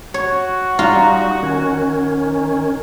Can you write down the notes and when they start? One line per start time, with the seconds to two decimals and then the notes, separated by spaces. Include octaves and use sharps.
0.14 F#4 C#5
0.79 G3 D#4 F4 F5 A#5
1.43 D#3 C#4